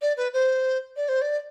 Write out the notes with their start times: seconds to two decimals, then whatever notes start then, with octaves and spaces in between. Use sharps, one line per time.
0.01 D5
0.17 B4
0.33 C5
0.96 D5
1.08 C5
1.21 D5